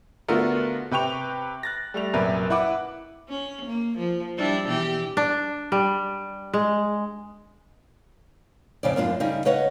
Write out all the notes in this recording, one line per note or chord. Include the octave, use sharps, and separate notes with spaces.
D3 A3 B3 F4 F#4 A#4
C3 B4 G5 C#6 F7
F#6 A6 A#6
G3 A3 F7
A#1 F#2 C3 A#4 B4 E5
E4 B4 F#5 D6
C#4
A#3
F3
G3 D4 E4
B2 E3 G4
D4
G3
G#3
F2 C#3 D5
F#2 A#3 D4 F4
C#3 G3 D#4 E4
C#3 B4 C#5 D#5 F#5